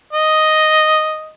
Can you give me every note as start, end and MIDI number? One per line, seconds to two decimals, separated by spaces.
0.13 1.32 75